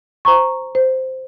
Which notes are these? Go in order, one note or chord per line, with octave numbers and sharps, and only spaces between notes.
C5 A#5 C#6
C5